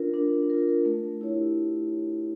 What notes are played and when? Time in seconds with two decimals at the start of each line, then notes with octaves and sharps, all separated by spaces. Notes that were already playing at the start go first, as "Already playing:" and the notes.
Already playing: D4 F4 A#4
0.14 D4
0.50 F4 A#4
0.85 A3
1.21 E4 G4 C#5